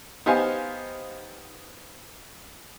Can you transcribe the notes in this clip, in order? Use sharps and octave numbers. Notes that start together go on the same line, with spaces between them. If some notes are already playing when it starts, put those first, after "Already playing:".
B3 D#4 G4 C5 F5 G#5